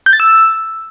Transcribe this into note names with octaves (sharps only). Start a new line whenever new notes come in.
G6
A6
E6